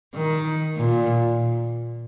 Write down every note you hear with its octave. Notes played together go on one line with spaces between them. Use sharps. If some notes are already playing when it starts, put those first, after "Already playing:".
D#3
A#2